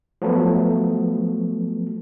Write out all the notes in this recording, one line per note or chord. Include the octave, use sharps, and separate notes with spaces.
F3 F#3 A3 B3